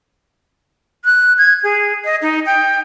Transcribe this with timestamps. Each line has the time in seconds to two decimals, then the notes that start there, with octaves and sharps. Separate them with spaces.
1.05 F#6
1.38 G#6
1.63 G#4
2.05 D#5
2.22 D#4
2.46 G5